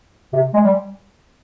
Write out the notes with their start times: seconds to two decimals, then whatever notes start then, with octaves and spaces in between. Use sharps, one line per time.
0.33 C3
0.54 G#3
0.64 G3